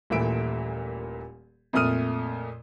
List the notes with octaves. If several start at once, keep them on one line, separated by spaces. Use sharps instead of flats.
D#1 A#2 E3 A3 E5 D7
F2 A#2 A3 D#6 F6 D#7